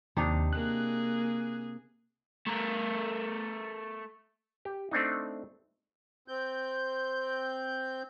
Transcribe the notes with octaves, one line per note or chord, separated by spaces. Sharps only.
D#2 C3 D4 D#4
A#3 G#4 F#6
A3 A#4
G4
A3 C4 D4 D#4
C4 G6